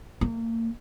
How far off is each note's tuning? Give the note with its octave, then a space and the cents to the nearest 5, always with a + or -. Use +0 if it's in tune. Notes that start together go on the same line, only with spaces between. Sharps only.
A#3 -35